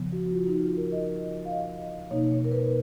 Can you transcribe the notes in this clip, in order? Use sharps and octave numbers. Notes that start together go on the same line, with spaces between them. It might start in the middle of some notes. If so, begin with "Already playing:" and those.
Already playing: C#3 F3 B3
F#4
F4
D#4
F4
A#4
D#5
F5
D#5
B2 A#3 D#4 C#5
C#5
A#4
B4